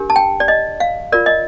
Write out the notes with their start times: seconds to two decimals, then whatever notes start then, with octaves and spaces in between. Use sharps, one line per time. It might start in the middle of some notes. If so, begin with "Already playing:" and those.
Already playing: D4 G4 A#4
0.10 A5
0.16 G5
0.40 D5
0.48 D#5
0.80 F5
1.12 F4 A#4 D5
1.26 D#5